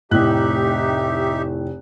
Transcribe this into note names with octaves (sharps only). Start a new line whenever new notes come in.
F1 A2 D#4 G4 E5 F#6